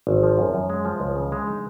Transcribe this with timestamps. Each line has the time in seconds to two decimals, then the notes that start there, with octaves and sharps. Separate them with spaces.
0.07 G#1
0.23 F3
0.38 F#2
0.54 F#2
0.70 G#3
0.85 F3
1.00 C#2
1.16 C#3
1.32 G#3
1.47 D#4